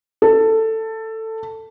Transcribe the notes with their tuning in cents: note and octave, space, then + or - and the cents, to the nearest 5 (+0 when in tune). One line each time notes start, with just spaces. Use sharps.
A4 +15